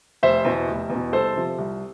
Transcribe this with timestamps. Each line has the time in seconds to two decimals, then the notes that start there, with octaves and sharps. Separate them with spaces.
0.23 F1 C5 E5
0.45 E2 B2
0.68 F1
0.90 E2
0.95 B2
1.12 C2 A4 C5
1.36 C3 F3
1.58 C2